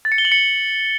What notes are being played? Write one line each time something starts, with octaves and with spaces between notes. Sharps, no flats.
A6
C#7
G7
F#7
C#7